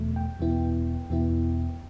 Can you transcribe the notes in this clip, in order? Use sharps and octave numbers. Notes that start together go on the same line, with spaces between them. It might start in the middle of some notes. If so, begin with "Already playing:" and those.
Already playing: E2 B2 A3
G5
E2 B2 B3 E4
E2 B2 B3 E4